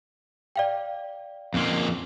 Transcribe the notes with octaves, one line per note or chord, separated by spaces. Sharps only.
D5 F5 G5
F2 A#3 C4 C#4 G#4